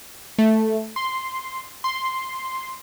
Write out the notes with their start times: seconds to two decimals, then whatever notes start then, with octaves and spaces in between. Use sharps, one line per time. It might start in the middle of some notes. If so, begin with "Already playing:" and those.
0.38 A3
0.96 C6
1.84 C6